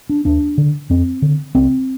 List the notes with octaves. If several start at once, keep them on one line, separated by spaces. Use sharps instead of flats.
D4
D#2 D4
D3
F2 C4
D3
C2 C4